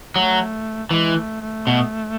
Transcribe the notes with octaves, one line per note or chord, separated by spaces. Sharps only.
F#3 A3
E3 G#3
A3
A3
B2